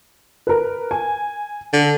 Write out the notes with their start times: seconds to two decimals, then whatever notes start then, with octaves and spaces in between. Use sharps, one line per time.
0.47 A#4 B4
0.91 G#5
1.73 D3